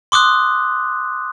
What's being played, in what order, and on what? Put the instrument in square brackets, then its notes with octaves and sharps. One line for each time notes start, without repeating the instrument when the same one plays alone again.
[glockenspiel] C6 D6 D#6 F#6